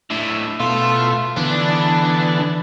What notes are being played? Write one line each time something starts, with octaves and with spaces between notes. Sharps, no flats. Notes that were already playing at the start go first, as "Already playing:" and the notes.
A2 D3 E5
B2 A3 F4 E5
D3 E3 B3 D4